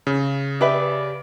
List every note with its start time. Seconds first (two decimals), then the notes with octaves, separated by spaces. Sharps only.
0.07 C#3
0.61 G4 B4 D5 E5